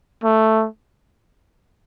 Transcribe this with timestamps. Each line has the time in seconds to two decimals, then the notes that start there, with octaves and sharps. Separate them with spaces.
0.24 A3